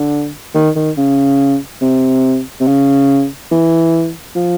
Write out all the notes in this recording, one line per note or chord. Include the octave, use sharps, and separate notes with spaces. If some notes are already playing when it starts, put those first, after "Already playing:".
Already playing: D3
D#3
D#3
C#3
C3
C3
C#3
E3
F3